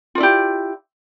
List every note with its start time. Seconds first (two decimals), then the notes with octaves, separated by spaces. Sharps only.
0.15 F4
0.18 D5
0.20 E4
0.23 G4